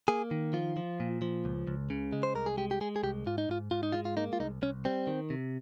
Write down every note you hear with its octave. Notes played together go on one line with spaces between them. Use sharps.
A#3 G#4
D#3
F3 F4
F3
A#2
F3
C#2
C#2
C#3
G#3
C5
C2 A#4
G#4
G#3 G4
G4
G#3 G#4
G#4
C2 G4
G#2 F4
D#4
G#2 F4
G#2 F4
D#4
G#3 F4
F4
A#3 D#4
F4
C2 D#4
C2 C#4
G3 C4
D#3
C3